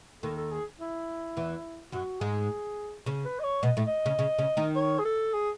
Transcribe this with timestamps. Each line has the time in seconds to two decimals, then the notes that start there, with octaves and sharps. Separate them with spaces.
0.23 D#2 D#3 A4
0.37 A4
0.51 G#4
0.80 E4
1.37 E2 E3
1.92 F#2 F#3 F#4
2.21 G#2 G#3 G#4
3.06 C#3 C#4
3.25 B4
3.39 D#5
3.43 C#5
3.63 B2 B3 D#5
3.77 A2 A3
3.87 D#5
4.06 C#3 C#4
4.19 C#3 C#4
4.38 C#3 C#4
4.57 D#3 D#4
4.76 C#5
4.99 G#4
5.05 A4
5.33 G#4